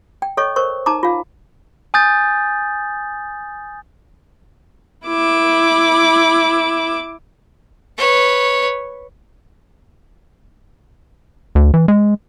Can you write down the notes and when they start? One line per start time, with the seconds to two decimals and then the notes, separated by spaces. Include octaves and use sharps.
0.22 G5
0.37 A4 C#5 D#5 C#6
0.56 A#4 C5 C#6
0.86 D#4 A5 A#5 D6
1.03 F4 F5
1.94 G#5 D#6 G6 A6
5.07 E4 D6
7.97 B4 C#5
11.55 D2
11.74 E3
11.88 G#3